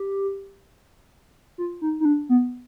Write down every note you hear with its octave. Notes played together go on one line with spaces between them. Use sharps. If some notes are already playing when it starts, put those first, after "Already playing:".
Already playing: G4
F4
D#4
D#4
D4
B3